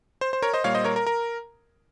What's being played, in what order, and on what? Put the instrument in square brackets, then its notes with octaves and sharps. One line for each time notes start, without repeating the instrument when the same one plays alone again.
[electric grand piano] C5
C5
A#4 C#5
C5 D#5
A#2 G3 A#3 C#5 F5
C5 D#5
A#4 C#5
A#4
A#4